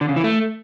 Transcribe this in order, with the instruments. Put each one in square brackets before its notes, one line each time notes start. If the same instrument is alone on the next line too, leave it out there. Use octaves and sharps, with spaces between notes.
[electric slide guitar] D3
C#3
E3
A3